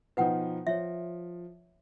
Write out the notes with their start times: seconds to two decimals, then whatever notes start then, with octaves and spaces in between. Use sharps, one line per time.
0.17 B2 F3 D#4 B4 F#5 G5
0.67 F3 C#5 E5